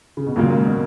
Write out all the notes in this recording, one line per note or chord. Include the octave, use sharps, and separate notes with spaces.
C#3
B2
D#2 A#2 C#3 F#3 A#3
G#2
B2